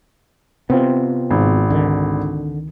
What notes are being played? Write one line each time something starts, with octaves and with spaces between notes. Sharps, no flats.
C3 B3 C4 F4
G#1
C#2 D3 D#3